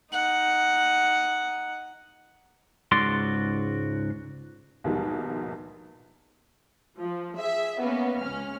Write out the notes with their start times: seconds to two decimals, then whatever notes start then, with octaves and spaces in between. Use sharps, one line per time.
0.12 D#4 F#5
2.92 C#2 G#2 F#4 D5 C6
4.84 A#1 D#2 G#2 B2 G3 G#3
6.99 F3
7.39 G#4 E5
7.80 A#3 B3 C#4
8.22 C#2 C#4 F6